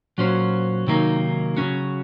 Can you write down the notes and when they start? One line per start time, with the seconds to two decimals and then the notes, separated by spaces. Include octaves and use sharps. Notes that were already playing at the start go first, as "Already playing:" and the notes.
0.18 A#2 F#3 C#4 F#4 C5
0.87 C3 D#3 F#3 A#3 D#4
1.57 C#3 F#3 C#4 F#4